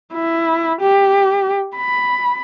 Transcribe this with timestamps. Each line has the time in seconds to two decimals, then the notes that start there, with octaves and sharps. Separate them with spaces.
0.14 E4
0.81 G4
1.76 B5